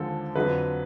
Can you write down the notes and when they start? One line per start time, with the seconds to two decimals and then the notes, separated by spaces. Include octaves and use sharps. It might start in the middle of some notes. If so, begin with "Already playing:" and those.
Already playing: D#2 D3 F3 G#3 A4
0.35 F2 D3 F#3 B4